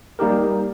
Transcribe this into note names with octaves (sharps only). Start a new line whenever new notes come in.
G3 A#3 D#4 G4 A#4